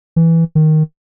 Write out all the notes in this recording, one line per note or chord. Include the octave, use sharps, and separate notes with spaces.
E3
D#3